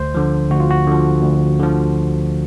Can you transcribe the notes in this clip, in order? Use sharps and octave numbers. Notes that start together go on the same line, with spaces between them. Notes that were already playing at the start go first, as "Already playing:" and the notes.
Already playing: D2 C5
D3 F3
D2 F#4
F4
F#4
D3 F3
D2
D3 F3